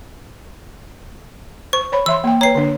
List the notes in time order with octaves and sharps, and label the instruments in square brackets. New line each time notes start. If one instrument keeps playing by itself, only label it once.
[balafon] C5 [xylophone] C#6
[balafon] C5 C#5 B5
[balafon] E3 E5 C6 [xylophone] E6
[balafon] A#3 G5
[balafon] B4 G5 A#5 [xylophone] C#5 C7
[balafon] D3 D4